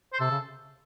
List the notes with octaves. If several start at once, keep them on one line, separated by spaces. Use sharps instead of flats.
C5
C3 A4
C#3